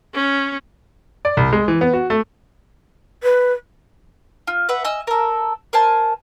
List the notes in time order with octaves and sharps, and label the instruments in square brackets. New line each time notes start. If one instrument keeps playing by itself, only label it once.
[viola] C#4
[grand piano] D5
C2
G#3
E3
B3
F#4
A3
[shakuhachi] B4
[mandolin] F4
B4 E5 F#5
D#5 G#5 E6
A4 A#4
A#4 C5 G#5 A5